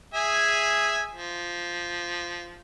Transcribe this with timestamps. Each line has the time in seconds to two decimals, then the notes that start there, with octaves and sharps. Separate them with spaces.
0.14 G#4 E5 G#5
1.12 F3